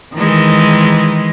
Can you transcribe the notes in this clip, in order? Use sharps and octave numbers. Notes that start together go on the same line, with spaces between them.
D#3 E3 G#3